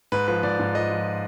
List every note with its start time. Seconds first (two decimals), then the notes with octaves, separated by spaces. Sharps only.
0.12 G#2 B4
0.28 F3 B4
0.43 G#2 D5
0.59 G#2
0.75 F3 D#5
0.90 F3